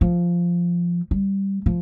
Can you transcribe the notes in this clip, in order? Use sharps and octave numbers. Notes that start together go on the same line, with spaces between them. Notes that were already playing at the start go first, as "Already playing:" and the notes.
F3
G3
F3